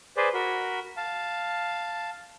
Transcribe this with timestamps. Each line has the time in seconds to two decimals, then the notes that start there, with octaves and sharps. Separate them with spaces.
0.17 G#4 B4 C5 D5
0.34 F#4 A#4 B5
0.97 F5 A5